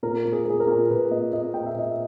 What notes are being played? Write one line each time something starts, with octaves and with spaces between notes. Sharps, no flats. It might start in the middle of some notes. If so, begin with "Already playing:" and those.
A#2 A#4
A#3
G#4
A#3 G#4
A#4
A#2
A#2 B4
A#3 D#5
A#3 D#5
A#2 G5
E5
A#2 D#5
E5